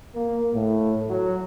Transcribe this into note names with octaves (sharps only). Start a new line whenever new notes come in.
A#3
A2
F#3